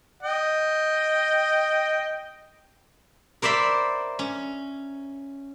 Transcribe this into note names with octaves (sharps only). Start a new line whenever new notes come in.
D#5 G5
A#4 C5 D5 E5 B5
C#4